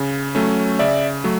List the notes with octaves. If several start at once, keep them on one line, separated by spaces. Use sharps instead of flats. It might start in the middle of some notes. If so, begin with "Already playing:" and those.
Already playing: C#3
F#3 A3 C#4
C#3 D5 E5
F#3 A3